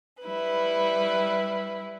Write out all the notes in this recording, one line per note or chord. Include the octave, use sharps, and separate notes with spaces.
G3 E4 B4